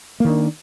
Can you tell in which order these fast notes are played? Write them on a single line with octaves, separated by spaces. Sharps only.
A#3 D#3 D4